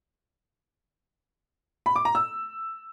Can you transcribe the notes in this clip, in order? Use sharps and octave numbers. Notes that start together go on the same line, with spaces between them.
B5
D6
A#5
E6